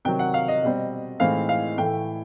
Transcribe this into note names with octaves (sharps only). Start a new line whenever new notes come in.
C3 D#3 F#3 G5
F#5
F5
D#5
B2 G3 C4
A2 E3 G#3 C4 D#4 F5
F5
A2 E3 A3 G5